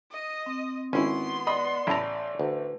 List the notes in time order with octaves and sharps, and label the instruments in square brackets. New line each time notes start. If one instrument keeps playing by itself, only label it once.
[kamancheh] D#5 D#6
[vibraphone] C4
[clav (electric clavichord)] G#1 [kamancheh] B3 C6 [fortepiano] C#4 E4
[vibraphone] D5 [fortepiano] D#5 B5 D#6
[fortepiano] A1 A5 [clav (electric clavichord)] E4 A#5
[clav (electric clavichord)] D2 [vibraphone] B4